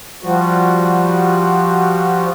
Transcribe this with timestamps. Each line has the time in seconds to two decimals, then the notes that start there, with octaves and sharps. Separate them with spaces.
0.23 F3 G3 F#4